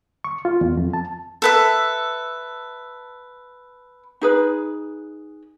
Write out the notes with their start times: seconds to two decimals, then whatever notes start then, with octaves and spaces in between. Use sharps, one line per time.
0.24 C#6
0.45 F4
0.61 E2
0.77 F2
0.93 A5
1.42 A4 B4 E5
4.21 D#4 G#4 B4